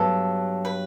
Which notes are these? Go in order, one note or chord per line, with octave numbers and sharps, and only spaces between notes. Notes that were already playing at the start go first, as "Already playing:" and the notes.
Already playing: G2 F#3 B3 A4
B4